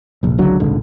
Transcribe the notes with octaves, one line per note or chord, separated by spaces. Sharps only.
F1 A#1
G#1 C#2 D3 F#3
D#1 G#1 C#2 D3